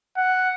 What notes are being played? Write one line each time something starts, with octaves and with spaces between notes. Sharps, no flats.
F#5